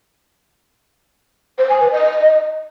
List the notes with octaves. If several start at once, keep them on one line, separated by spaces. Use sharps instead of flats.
C5
G#5
B4
D#5